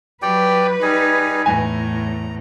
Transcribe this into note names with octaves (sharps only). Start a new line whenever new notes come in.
F#3 G4 B4 D5 G5
G3 D#4 G#4 G#5
E2 A2 G#5 A#5